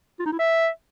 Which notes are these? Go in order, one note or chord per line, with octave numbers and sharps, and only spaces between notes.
F4
D#4
E4
E5